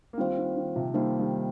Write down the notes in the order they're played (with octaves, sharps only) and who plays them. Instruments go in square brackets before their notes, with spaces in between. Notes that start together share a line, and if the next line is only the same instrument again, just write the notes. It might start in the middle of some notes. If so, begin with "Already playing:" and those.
[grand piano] A#3
[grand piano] D#3 G3 [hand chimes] C4 F4 C5 F5
[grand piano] D#3
D#3
C3 F3
[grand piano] D#3 G3 [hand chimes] A#3 D#4 C5 F5
[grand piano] D#3 G3